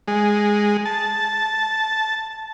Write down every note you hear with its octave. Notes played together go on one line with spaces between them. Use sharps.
G#3
A5